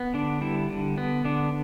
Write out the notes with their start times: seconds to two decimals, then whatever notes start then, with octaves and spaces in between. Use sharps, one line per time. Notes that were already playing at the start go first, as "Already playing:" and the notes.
Already playing: B3
0.14 D3 D4
0.41 G3 E4
0.70 D3
0.98 B3
1.24 D3 D4